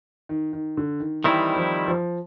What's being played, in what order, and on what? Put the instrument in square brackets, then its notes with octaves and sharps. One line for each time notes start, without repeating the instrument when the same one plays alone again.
[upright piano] D#3
D#3
D3
D#3
[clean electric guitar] D#3 G3 C4 E4 [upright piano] E3
[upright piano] F3
F3